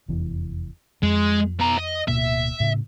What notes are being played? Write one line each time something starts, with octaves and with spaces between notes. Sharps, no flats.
F1 E2 E3
F2 F3 G#3
B2 A#5
D#5
D1 B2 A#3 E5
A2 C#3